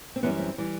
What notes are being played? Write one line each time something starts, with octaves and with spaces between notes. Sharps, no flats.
C4
F#2 E3 G3 B3
C4
E3 G3